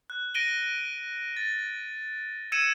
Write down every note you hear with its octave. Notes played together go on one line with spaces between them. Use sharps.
F#6
A#6 D7 D#7 G7
A6
E6 G#6 C#7 D#7 E7